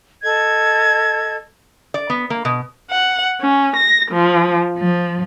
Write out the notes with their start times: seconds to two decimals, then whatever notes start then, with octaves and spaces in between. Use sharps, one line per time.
0.23 A4 D#5 G#6
1.94 D5
2.10 B3
2.30 A#3
2.45 B2
2.90 F#5
3.40 C#4
3.75 A#6
4.10 F3
4.76 F3